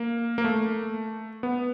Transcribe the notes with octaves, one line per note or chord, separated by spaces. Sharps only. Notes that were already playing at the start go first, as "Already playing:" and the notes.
Already playing: A#3
A#3
A3
B3